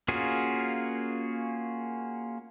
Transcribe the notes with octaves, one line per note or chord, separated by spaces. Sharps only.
A#3 C#4 F4 F#4 G#4